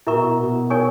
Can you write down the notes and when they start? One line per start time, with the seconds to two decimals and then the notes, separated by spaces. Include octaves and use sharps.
0.07 B2 E4 A#4 E5 A#5 C#6
0.39 B2
0.70 D#4 A#4 C#5 G#5 C#6